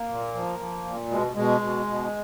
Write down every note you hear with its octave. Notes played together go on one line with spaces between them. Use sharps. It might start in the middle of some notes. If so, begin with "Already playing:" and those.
Already playing: A#3
A#2
F3
F3
A#2
B2 G#3
B2 G#3
B2
B2